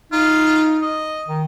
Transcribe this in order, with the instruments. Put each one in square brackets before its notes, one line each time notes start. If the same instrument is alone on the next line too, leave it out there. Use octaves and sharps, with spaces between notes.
[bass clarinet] D#4 [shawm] F4
[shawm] D#5
[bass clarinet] D#3